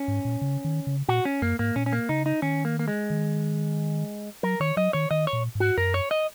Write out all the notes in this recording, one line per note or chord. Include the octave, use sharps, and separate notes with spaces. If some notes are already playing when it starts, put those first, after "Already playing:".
Already playing: C#4
G#2
A#2
C#3
D#3
C#3
A#2 F#4
C#4
F#2 A#3
G#2 A#3
A#2 C#4
C#4
A#3
C#3 D#4
D#4
D#3 C#4
A#3
A#3
G#3
D#3
F#3 A#4
D#3 C#5
F#3 D#5
D#3 C#5
D#3 D#5
C#5
A#2
G#2
F#4
F#2 A#4
C#5
D#5